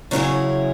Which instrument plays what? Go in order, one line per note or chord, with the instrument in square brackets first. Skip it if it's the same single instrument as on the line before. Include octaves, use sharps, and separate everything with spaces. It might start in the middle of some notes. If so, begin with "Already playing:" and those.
[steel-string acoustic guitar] C#3 F#3 C#4 E4 G#4